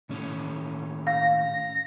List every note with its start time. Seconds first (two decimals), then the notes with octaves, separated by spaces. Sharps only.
0.09 A2 D#3 C#4
1.07 F5 A#6
1.39 A#6